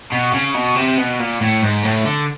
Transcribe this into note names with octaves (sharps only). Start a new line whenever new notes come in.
B2
C#3
B2
C3
B2
A#2
A2
G#2
A2
D3